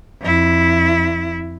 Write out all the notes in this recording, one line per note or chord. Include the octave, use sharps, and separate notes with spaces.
F2 E4